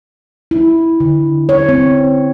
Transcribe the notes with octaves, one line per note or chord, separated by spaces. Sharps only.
E4
D3
C#5
C4